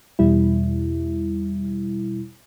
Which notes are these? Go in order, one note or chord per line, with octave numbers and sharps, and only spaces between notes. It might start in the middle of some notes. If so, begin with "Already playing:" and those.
E2 B2 G3 E4